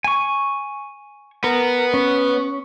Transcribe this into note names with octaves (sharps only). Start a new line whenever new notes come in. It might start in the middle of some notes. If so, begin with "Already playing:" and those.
G#5 C#6
B3 A#4
C#4